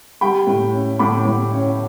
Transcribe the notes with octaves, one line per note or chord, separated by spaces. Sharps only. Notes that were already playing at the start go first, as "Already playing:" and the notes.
G3 G5 B5
A2
C#4
A2 B5 D6
A2
C#4